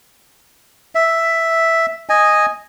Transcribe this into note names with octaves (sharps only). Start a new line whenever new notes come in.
E5
D#5 G#5